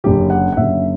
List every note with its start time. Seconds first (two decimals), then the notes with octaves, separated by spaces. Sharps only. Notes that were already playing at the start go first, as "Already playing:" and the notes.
0.04 F#1 F#2 D3 G4
0.30 F#5
0.52 F#5
0.57 F#1 F#2 D3 E5